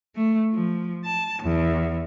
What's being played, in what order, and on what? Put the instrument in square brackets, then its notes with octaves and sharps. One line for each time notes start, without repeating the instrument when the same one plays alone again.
[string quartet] A3
F3
A5
E2